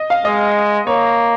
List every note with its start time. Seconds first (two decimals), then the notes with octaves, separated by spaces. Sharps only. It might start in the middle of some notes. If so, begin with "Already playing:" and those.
Already playing: D#5
0.10 F5
0.25 G#3 D#5
0.87 A#3 C#5